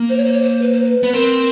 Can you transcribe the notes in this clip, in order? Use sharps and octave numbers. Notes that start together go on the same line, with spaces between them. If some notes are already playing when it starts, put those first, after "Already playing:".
Already playing: A#3
C5
C#5
C5
C#5
C5
B4
C5
B4
B3
C4 A#4